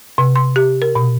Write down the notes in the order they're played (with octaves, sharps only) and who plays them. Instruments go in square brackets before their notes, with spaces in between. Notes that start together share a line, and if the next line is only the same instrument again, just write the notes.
[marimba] C3
C6
G4
A#4
B2